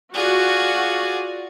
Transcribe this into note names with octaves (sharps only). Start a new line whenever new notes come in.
F4 F#4 G#4 D5